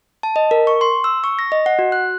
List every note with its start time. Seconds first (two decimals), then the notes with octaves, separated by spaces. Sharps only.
0.23 A5
0.36 D#5
0.51 A#4
0.67 C#6
0.81 C6
1.04 E6
1.24 C#6
1.39 A#6
1.52 D#5
1.66 F#5
1.79 F#4
1.92 F#6